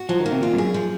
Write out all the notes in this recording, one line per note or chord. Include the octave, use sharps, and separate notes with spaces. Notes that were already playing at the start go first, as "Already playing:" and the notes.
Already playing: F#4
F3 F#3
D#3
A#3
C3
A#2 F4
G#2
F#2 G#4
F3